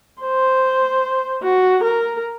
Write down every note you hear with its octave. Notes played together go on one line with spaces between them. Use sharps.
C5
F#4
A#4